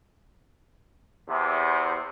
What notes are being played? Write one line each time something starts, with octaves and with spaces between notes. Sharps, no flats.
E2 C3